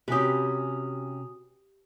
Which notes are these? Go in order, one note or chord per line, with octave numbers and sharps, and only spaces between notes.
C3 C#4 F#4 G4 B4 G#5 D#6